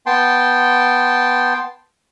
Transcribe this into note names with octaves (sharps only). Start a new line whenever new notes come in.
B3 G5 A5 C6